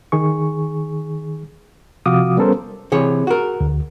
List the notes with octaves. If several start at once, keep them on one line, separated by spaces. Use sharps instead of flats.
D#3 G#4 C#6
C3 F3 F#4 F5 D6 D#6
G3 B3 C#4 A4 A#4 C5
C3 E3 G#4 C#5
F#4 A#4
D2